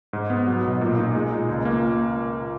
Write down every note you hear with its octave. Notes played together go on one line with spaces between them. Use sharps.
G#2
B3
F#3
B1
A#2
D#4
G#3
A#2
C#2
A#3